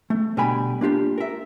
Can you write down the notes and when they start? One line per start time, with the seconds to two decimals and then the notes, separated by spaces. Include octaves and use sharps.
0.10 A3
0.37 B2 D3 G3 G5 G#5 B5
0.81 A#3 D4 F4 G4
1.18 A#4 E5